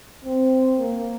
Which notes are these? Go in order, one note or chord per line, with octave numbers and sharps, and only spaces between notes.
C4
A#3